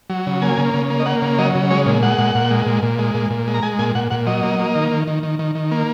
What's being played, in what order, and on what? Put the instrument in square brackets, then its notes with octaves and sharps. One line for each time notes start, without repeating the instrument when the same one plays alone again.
[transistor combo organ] F#3
C#3
A#3 G#5
C#3
C#3
A#3
D#5
A#3 F#5
C#3
F#3 D#5
C#3
G#3 C#5
A#2
G#3 F#5
A#2
A#2
G#3
A#2
A#2
G#3
A#2
A#2
G#3
A#5
G#3 G#5
A#2 G#5
A#2 F#5
A#2 F#5
F#3 D#5
A#3
A#3
D#3
D#3
D#3
D#3
D#3
D#3
A#3